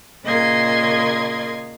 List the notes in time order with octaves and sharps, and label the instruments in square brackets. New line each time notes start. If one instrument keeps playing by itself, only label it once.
[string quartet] A#2 C#3 A#3 D#5 C6 G#6